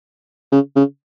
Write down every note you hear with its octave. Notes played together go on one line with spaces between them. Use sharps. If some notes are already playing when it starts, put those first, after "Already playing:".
C#3
C#3